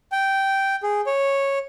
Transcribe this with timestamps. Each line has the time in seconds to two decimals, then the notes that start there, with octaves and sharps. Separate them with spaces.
0.12 G5
0.83 G#4
1.06 C#5